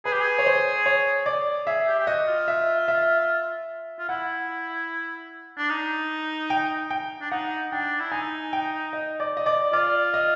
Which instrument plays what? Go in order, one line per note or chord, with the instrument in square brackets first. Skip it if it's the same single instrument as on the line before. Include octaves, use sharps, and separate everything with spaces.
[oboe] G#4 [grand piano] B4
[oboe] G4
G#4
[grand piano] C#5
C5
C#5
D5
[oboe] G#4 [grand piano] E5
[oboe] G4
G4
[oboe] F#4 [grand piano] D#5
[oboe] F4
[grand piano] E5
E5
[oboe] F4
[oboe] E4 [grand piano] F#5
[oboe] D4
D#4
[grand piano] G5
G5
[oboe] D4
[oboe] D#4 [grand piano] F#5
[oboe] D4 [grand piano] G5
[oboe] E4
[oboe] D#4 [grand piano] G#5
[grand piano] G5
D#5
D5
D#5
D5
[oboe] F4 [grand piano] D5
[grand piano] D#5